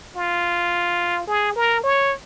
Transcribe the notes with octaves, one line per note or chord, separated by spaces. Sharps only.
F4
G#4
A#4
C#5